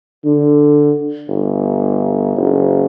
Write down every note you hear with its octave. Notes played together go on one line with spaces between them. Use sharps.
D3
G1
F#1